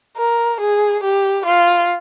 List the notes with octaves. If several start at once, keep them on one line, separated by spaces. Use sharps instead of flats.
A#4
G#4
G4
F4